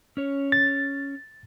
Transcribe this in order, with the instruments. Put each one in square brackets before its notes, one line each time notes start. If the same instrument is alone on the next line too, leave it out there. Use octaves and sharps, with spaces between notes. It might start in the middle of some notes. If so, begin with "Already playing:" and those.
[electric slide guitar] C#4 C#5
[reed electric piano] A6